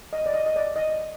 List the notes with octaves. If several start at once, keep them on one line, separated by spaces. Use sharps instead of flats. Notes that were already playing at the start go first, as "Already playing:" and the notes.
D#5
D5
D#5
D#5
D5
D#5